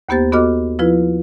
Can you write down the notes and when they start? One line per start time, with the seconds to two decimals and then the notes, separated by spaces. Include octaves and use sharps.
0.09 D#2 A#3 B3 G4 C5 A6
0.32 B3 F#4 A4 D#5 D6 F6
0.79 F3 E4 F4 B4